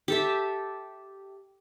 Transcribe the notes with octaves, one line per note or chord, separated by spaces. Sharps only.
G4 A4 E5